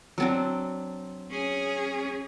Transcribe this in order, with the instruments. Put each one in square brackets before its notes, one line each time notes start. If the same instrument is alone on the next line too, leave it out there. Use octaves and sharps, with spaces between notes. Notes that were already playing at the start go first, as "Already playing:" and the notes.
[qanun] F#3 C4 D4
[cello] C#4 G#4